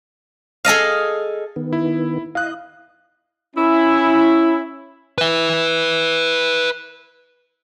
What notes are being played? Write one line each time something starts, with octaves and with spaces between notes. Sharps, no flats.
G#4 A4 D#5 F5
D#3 B3
E4
E4 D#5 F5 F#6
C#4 E4
B4 E5